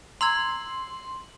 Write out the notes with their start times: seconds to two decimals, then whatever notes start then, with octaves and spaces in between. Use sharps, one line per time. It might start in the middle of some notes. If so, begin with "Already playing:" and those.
0.21 A#5 C6 E6 G#6 F#7